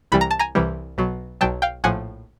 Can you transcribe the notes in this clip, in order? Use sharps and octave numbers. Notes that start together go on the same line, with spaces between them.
C2 C3 E3 G3 B5
A#5
A5
G#5 A#5
C2 C3 E3 G3
B1 B2 F#3
B1 B2 F#3 G5 A5
F5 G5
A#1 A2 F3 F#5 G#5